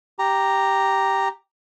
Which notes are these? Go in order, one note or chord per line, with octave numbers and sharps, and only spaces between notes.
G4 A#5